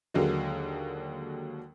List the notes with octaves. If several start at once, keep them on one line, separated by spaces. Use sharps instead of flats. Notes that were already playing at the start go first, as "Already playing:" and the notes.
D#2 D3 F#3 G#3 A#3